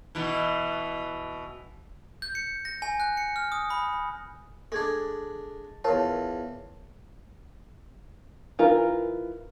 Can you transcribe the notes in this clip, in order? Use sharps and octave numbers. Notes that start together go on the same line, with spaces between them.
B2 E3
G6
C#7
A#6
G#5
F#6
C#7
F6
D#6
B5
G#3 D4 A4 G#6
E2 F4 A#4 C#5 A5
E3 F4 A#4